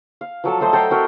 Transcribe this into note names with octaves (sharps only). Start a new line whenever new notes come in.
F5
F3 F#3 A4 A5
F#3 A3 C5 D#5
A4 G5 A#5 C6
C4 F#4 A#4 E5